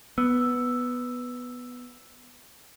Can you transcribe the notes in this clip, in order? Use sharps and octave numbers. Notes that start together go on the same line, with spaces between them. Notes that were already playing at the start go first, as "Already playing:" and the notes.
B3 E6